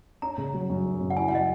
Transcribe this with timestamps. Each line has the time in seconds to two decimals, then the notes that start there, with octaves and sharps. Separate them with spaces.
0.22 C#4 A#5
0.38 C#3
0.54 F#3
0.70 F#2
0.85 C#4
1.01 C#3
1.10 F#5
1.17 E4 G#5
1.28 F#5
1.32 F#3 D#5